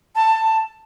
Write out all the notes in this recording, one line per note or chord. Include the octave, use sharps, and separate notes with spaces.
A5